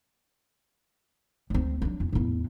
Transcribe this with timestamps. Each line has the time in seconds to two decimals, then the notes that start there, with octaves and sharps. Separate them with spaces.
1.50 D2 C4
1.82 F#3 D4
2.00 E2
2.13 E2 A2